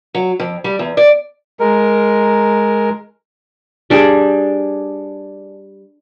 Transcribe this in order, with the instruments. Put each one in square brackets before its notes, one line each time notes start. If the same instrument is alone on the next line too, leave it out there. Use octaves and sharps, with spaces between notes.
[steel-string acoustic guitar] F#3
F2
G3
E2
D5
[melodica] G#3 A#4
[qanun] G3 D4 G#4